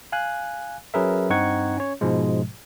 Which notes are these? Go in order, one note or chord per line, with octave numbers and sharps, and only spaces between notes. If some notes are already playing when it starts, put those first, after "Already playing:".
F5 G#5 F#6
F#3 C#4 G#4 A#4 B4 E5
G2 C4 D#4 F#5 C#6 G#6
C#4 C#5
G#2 B2 F3 G#3